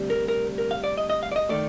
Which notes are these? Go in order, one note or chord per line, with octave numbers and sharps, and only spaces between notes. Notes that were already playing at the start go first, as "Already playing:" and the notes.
Already playing: D2 C3 G3
A#4
A#4
A#4
F5
D5
D#5
D#5
F5
D5
D#5
D#3 A3 D5